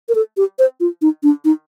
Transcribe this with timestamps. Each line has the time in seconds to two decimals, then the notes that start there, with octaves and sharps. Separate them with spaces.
0.09 A#4
0.15 A4
0.37 G4
0.59 C5
0.80 F4
1.02 D#4
1.23 D4
1.45 D#4